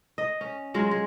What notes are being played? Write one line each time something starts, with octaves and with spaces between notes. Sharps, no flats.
D#5
C#4
F#3 G#3 F4 F#4
G#3